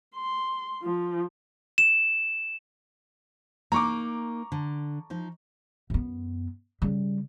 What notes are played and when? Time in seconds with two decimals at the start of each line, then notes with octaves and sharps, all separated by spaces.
0.15 C6
0.82 F3
1.78 E7
3.72 A#3 D#4 A#5 C#6 D6
4.52 D3
5.10 F3 D#4
5.90 F#2 B3
6.82 C#3 G3